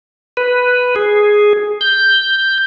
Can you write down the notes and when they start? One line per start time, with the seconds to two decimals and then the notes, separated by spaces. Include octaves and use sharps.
0.37 B4
0.96 G#4
1.81 G6